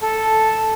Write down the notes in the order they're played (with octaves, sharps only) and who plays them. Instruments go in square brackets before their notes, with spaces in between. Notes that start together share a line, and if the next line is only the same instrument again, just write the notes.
[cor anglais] A4